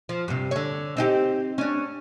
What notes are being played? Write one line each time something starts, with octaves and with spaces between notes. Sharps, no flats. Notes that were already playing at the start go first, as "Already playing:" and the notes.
F3
G2 C3
D3 C#5
C4 D#4 G4
C#4 D4